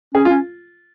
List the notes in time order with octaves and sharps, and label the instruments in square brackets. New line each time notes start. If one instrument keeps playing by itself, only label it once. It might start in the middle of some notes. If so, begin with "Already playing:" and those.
[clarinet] C#4 [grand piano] G#4
[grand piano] F4
[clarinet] C#4